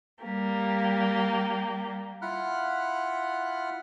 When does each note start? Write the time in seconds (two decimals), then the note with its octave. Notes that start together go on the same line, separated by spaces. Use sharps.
0.24 G3 A#3 G4
2.22 E4 F4 F#5 B5 F6 F#6